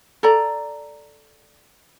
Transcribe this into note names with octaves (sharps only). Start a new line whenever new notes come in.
A4 D5 A#5